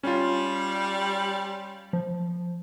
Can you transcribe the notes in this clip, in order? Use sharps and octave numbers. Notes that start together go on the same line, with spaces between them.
G3 C#4 F4
F3